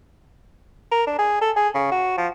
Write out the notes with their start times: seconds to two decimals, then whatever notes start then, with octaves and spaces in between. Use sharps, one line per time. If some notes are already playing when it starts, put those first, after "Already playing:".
0.92 A#4
1.07 D4
1.18 G#4
1.41 A4
1.56 G#4
1.74 C#3
1.92 F#4
2.18 F3